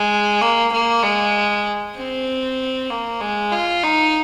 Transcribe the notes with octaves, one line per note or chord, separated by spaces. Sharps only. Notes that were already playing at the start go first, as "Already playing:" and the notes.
Already playing: G#3
A#3
A#3
G#3
C4
A#3
G#3
F4
D#4